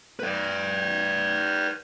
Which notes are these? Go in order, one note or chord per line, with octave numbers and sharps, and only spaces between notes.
B4 D5